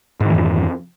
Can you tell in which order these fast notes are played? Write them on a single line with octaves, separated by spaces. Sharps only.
G#2 D#3 E3 F2